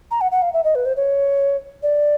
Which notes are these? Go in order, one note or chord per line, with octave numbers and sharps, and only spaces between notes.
A#5
F#5
F#5
F5
E5
D#5
B4
C5
C#5
D5